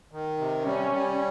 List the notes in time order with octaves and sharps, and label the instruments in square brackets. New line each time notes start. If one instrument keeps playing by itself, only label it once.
[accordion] D#3
C3
[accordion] G3 [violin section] C#4
[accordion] G3